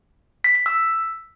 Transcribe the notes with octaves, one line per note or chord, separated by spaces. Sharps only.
B6
B6
E6